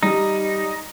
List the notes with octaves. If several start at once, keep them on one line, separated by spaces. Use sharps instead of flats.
G3 D#4